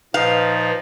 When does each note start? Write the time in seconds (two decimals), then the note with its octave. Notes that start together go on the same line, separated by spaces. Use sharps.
0.14 A#2 F3 D#4 B4 F5